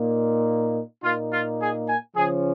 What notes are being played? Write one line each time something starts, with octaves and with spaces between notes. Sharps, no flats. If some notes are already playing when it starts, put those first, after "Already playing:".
Already playing: A#2 A#3 D#4
A#2 A#3 D#4 F4
F4
G#4
G#5
C#3 F3 C#4 G#4